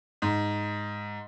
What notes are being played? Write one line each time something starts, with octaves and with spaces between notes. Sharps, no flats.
G#2